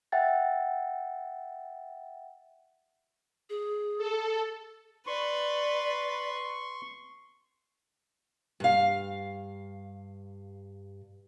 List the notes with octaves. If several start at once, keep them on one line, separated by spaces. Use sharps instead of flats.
E5 F#5 G5 A6
G#4
A4
B4 D5 C6 C#6
G2 F5